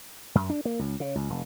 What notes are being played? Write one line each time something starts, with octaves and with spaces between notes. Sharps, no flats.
F#2
D4
A#3
C#2
C#3
C#2
F1